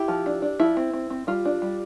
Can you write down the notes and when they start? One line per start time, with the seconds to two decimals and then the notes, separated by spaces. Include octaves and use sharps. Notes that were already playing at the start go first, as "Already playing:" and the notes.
Already playing: E4 G4
0.08 F3
0.26 D4
0.42 D4
0.60 F3 E4
0.77 C4
0.93 C4
1.10 C4
1.27 G3 F4
1.45 D4
1.62 G3